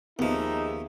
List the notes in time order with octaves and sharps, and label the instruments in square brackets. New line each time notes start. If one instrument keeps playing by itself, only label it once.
[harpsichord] D#2 F3 [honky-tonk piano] B3 [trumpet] D#4 [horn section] G#4 E5